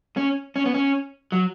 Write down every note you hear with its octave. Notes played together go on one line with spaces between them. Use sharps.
C#4
C#4
B3
C#4
F#3